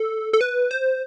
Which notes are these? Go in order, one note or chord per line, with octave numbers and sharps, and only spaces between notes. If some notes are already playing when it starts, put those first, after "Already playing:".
Already playing: A4
A4
B4
C5